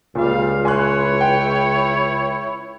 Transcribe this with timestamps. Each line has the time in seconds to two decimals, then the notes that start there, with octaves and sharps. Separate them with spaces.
0.15 C#2 A#2 G3 F5
0.65 E4 C#5 G#5 C6 F#6
1.21 G5